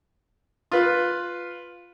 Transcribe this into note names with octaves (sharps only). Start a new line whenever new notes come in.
F4 B4